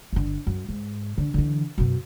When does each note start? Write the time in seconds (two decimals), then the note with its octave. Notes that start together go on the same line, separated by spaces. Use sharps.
0.13 G1 D3
0.47 F#2
0.69 G#2
1.18 D3
1.34 D3 E3
1.78 F#2 B2